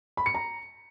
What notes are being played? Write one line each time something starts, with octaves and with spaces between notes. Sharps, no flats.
B5
C#7
A#5